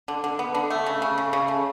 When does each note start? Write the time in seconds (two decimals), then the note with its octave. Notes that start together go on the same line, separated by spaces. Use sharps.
0.08 D3
0.24 D3
0.39 B3
0.55 D3
0.70 A3
0.86 C#3
1.02 C#3
1.18 C#3
1.33 C#3
1.48 A3